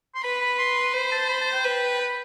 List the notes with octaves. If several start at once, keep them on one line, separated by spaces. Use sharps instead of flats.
C6
B4 B5
B5
C6
C5 B5
A5
B5
A5
G5
B4
B5